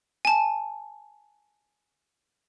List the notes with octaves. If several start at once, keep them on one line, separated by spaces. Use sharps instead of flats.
G#5 A5